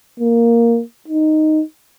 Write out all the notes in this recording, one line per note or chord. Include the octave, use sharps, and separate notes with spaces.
A#3
D#4